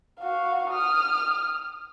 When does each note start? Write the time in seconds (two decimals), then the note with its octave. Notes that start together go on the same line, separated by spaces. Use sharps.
0.20 F#4 F5
0.72 D#6 F6